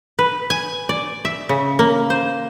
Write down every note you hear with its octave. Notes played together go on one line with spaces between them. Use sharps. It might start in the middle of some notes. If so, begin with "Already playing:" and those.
B4
G#5
D5
E5
C#3
A#3
C5